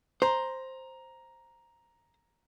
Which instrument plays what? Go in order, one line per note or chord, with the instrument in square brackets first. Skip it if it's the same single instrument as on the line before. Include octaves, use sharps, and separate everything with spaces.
[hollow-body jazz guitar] C5 [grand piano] A#5